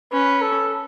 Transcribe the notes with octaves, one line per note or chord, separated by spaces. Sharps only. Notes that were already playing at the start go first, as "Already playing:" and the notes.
C#4 B4
A4